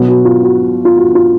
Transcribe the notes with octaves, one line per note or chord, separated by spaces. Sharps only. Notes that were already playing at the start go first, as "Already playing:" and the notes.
Already playing: B2 F#3
F#4
F4
F#4
F4
F#4
F4